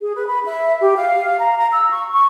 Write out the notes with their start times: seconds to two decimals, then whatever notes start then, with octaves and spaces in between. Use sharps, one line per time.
0.01 G#4
0.14 B4
0.28 B5
0.45 E5
0.80 G4
0.97 F5
1.39 A#5
1.58 A#5
1.72 E6
1.89 C#6
2.13 C#6